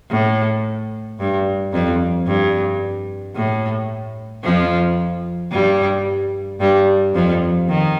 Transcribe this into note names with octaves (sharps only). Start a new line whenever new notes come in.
A2
G2
F2
G2
A2
F2 F3
G2 G3
G2 G3
F2 F3
D#3